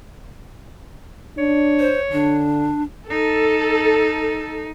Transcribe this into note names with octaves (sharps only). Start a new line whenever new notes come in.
D4 C#5
C5
D3 D4
D#4 A4